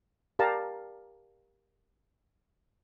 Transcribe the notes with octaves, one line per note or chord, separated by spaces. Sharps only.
G4 A#4 D5 F5 A5 A#5